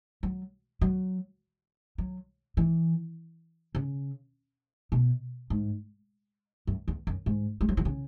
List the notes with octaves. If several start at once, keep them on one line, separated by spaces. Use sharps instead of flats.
F#3
F#3
F#3
E3
C#3
B2
G#2
F#2
E2
F#2
G#2
G#3
F#3
E3
C#3